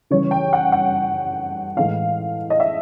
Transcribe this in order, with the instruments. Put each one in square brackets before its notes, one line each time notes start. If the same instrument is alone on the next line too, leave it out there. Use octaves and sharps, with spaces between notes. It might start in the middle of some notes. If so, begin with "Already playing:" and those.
[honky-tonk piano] C#3 E3 G3 C#5
G5
F#5
F#5
A2 E3 G#3 F5
D#5
E5